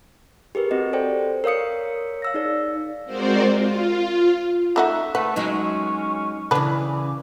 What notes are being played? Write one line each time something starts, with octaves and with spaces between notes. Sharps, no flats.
G4 G#4 A#4 B4
C4 F#4 D#5
A4 C5 D5 G5
A#4 C#5 F5 D#6 C#7
F5 E6 A#6
D#4 G#4 D5
G#3 C4 F#4 A#4 C5 D5
F4
A3 D#4 F#4 E5
A3 B4 F#5
F#3 G#3 C#4 D#4
C#3 E3 D4 B4 D5